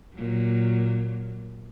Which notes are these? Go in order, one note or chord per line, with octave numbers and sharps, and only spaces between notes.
A#2 F#3